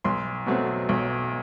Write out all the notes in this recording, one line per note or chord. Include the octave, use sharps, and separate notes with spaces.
B1 C6
B2 F#3 A3 C4
B1